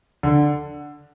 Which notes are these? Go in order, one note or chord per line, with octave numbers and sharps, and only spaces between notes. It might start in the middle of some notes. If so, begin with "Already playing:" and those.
D3